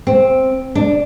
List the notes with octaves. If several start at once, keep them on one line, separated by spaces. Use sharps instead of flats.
C4
D4